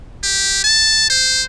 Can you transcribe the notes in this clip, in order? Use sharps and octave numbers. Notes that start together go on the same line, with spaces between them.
G4
A5
C5